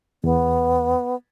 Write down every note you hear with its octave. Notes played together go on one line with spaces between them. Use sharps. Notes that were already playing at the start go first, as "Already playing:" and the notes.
E2 B3